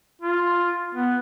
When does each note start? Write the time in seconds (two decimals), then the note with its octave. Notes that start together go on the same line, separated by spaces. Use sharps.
0.21 F4
0.95 B3